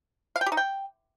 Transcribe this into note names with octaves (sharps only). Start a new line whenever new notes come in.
F5
G5
G4
D#4
G5